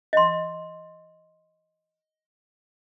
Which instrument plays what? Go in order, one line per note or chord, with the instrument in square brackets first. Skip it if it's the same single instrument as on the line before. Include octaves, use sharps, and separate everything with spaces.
[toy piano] D#5 C6